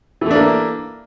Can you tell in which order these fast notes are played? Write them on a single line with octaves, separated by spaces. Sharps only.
E3 A3 D4 A#3